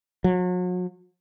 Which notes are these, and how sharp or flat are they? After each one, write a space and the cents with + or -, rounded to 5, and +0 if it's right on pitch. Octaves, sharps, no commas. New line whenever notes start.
F#3 -40